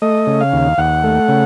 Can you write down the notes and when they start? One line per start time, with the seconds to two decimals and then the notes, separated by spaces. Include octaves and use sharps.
0.02 A3 D#5
0.27 C#3
0.41 F5
0.53 D#2
0.78 D#2 F#5
1.03 A3
1.28 C#3